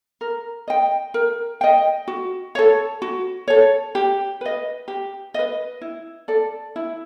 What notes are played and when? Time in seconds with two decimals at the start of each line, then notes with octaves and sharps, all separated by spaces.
0.21 A#4
0.68 D#5 G5
1.14 A#4
1.61 D#5 G5
2.08 F#4
2.55 A4 C#5
3.02 F#4
3.48 A4 C#5
3.95 G4
4.41 B4 D#5
4.88 G4
5.34 B4 D#5
5.81 E4
6.28 A4 D5
6.76 E4